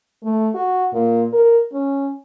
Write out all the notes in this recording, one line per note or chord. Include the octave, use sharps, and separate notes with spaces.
A3
F#4
A#2
A#4
C#4